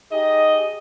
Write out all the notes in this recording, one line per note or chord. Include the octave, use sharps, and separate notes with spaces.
D#4 G4 G#4 D#5